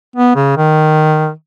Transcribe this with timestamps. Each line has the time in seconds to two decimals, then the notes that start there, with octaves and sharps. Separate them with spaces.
0.16 B3
0.35 C#3
0.57 D#3